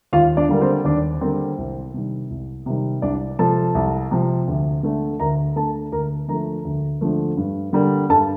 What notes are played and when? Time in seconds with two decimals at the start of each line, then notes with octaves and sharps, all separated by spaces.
0.13 D#2 F4 F5
0.37 D4 D5
0.49 D3 G3 A#3
0.61 C4 C5
0.85 D#2 D4 D5
1.21 D3 G3 A#3 C4 C5
1.58 C2
1.94 C3 D#3 G3
2.30 C2
2.66 C3 D#3 G3
3.02 C2 D4 D5
3.39 C3 F3 A4 A5
3.75 C2
4.11 C3 F3
4.48 D2
4.83 D3 A3
5.20 D2 A#4 A#5
5.56 D3 A3 A4 A5
5.92 D2 A#4 A#5
6.28 D3 F3 A3 A#4 A#5
6.65 D2
7.01 D3 F3 A3
7.37 G2
7.73 D3 G3 A#3
8.09 G2 A4 A5